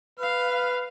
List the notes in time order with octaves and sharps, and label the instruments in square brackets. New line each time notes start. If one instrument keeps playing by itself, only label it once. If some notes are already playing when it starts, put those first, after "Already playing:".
[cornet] B4 [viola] F5